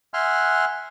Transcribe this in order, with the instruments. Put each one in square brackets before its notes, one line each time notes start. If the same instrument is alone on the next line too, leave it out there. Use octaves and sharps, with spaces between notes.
[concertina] E5 F#5 G#5 C6 F6 F#6